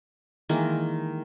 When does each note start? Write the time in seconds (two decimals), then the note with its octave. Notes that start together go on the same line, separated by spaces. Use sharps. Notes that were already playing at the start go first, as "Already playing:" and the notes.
0.49 D#3 E3 G#3 A#3